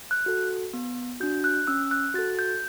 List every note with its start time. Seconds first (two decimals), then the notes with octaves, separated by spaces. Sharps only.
0.11 F#6
0.26 F#4 A4
0.74 B3
1.20 D4 F#4 G6
1.44 F#6
1.67 C#4 E6
1.91 F#6
2.14 F#4 A4 A6
2.39 G6